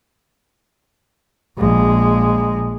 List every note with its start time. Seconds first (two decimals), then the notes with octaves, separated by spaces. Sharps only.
1.58 A#1 G#3